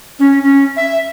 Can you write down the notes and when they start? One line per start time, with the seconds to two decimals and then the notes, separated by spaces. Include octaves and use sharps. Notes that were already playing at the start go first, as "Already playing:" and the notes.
0.19 C#4
0.43 C#4
0.76 E5